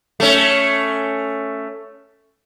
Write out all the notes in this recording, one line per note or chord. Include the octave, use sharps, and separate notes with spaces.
A3 C#4